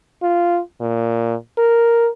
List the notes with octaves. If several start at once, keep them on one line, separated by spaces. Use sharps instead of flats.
F4
A#2
A#4